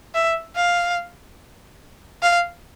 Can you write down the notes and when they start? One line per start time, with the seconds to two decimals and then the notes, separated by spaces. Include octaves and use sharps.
0.15 E5
0.56 F5
2.23 F5